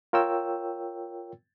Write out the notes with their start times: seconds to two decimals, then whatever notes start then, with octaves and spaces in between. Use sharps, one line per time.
0.13 F4 A#4 C#5 G5 E6